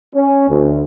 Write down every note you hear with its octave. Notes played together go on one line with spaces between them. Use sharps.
C#4
D2